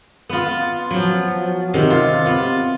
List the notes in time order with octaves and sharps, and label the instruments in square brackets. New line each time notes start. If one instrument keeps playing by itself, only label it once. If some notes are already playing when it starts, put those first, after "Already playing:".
[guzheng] B3 F4
F3 F#3
C3 D#3
F4
B3 F4